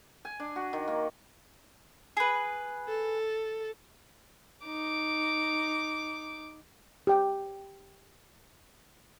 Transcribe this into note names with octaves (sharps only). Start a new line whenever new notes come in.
G#5
D4
F#4
D#3
A#3
G#4 B4
A4
D#4 D6
G4 G5